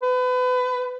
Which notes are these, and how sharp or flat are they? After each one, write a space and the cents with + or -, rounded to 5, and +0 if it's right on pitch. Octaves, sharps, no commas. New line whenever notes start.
B4 +30